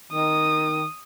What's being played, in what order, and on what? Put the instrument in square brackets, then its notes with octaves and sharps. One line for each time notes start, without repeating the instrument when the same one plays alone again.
[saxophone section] D#3 [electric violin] D#6